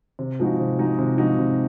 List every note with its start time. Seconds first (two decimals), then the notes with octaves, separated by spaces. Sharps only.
0.19 C3
0.40 F3 G#3 D#4 F#4
0.60 C3
0.78 F3 G#3 D#4 F#4
0.99 C3
1.18 F3 G#3 D#4 F#4
1.39 C3